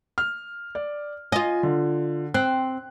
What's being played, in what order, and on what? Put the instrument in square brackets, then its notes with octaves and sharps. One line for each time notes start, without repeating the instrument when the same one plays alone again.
[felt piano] F6
D5
[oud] F4 D#5 [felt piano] G#5
[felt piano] D3
[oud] C4 [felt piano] F#6